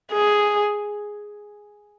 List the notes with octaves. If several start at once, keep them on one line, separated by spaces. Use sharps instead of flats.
G#4